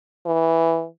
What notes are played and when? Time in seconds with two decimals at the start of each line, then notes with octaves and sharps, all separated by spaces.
0.26 E3